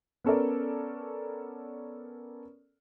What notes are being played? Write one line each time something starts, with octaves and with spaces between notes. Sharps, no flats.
B3 C#4 A4 A#4 D5